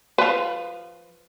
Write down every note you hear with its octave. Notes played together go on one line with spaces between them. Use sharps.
F3 B4